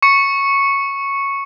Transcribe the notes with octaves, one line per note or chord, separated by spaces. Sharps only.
C#6 C#7